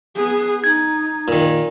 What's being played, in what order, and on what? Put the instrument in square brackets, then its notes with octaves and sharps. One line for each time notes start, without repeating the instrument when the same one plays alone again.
[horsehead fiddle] B3 G#4
[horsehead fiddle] D#4 [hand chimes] G#6
[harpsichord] A#2 D#3